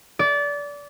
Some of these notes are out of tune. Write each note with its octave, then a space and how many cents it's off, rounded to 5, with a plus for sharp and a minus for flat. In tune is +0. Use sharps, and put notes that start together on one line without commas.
D5 -25